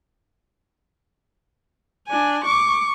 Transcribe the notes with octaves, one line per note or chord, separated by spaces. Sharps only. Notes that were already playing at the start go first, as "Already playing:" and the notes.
D4 G#5
C#6 D6